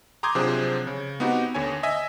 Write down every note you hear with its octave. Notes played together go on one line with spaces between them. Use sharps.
A#5 C6 D6 D#6 G6 G#6
C3 F3 F#3 D4 G#4 C5
C#3
B3 C4 D#4 F#4 G4
D#2 D3 C#5 G#5
D#5 E5 G#5